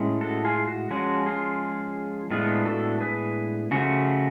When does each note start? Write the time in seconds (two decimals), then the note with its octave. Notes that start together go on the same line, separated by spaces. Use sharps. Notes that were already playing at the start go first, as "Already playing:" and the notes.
Already playing: A2 G#3 C#4
0.21 F#4 A4
0.44 F4 G#4
0.67 F#4
0.91 F3 G#3 C#4 F#4
1.26 F4 G#4
2.30 A2 G#3 B3 D4 F4 G#4
2.66 F#4 A4
3.01 G#4 B4
3.71 C#3 F3 A3 F#4